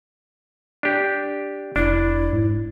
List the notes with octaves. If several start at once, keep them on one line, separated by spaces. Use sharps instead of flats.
D4 G4
F1 D4 E4
G#2